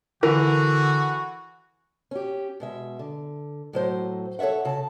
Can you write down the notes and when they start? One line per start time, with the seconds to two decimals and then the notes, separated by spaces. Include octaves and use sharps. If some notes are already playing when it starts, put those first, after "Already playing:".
0.23 D3 E3 F#4 A#4
2.11 C#4 G4
2.60 B2 G#3 E5
2.99 D3
3.73 A2 F#3 C5
4.39 A4 C#5 D5 E5 F#5
4.65 C#3 A5